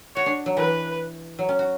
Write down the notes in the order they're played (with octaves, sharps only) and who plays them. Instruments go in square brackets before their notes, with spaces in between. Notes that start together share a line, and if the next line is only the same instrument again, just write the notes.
[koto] F#4 [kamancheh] C#5
[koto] D4
F#3
[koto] E3 [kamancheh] B4
[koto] F#3
C#4
F#4